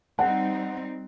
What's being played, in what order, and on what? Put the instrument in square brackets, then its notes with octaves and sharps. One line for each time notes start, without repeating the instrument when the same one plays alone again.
[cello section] G3 C4 D#4 [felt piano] F#5